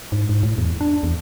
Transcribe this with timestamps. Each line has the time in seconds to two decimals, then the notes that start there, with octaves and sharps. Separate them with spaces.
0.12 G#2
0.29 G#2
0.43 A2
0.58 E2
0.81 D4
1.03 E2